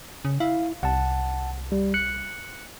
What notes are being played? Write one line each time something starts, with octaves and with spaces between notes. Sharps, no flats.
C#3
E4 F5
C2 F#5 A5
G3
F#6 C#7